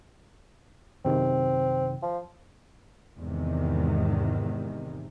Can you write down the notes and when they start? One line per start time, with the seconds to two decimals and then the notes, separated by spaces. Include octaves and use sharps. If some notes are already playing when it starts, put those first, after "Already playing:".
1.05 F#2 C3 D#3 C4
2.02 F3
3.18 E2 G#2 C3 D#3